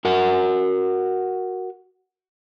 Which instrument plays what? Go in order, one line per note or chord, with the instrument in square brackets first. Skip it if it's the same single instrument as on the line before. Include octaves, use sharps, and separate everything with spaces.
[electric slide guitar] F#4 A#4 F#5